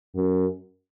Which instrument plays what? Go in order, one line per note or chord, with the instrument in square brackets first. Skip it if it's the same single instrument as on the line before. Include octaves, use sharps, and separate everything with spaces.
[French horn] F#2